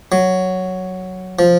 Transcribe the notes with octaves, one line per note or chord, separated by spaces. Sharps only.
F#3
F3